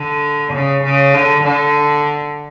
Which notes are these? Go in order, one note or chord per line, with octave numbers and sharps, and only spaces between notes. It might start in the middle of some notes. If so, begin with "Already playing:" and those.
Already playing: D3
C#3
C#3
D3
D3